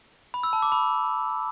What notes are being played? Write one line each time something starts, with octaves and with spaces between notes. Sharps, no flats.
B5
E6
A5
D6
B5